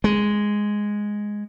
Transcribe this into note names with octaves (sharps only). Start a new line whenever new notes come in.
G#3